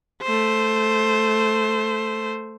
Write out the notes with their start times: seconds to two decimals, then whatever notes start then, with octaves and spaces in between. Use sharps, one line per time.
0.22 A3 C5